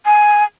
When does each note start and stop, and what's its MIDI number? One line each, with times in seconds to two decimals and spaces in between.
0.06 0.44 80